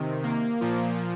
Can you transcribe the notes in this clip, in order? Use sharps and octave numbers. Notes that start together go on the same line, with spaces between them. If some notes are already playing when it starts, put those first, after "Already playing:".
Already playing: C3 D#3
A#3
A#2 F3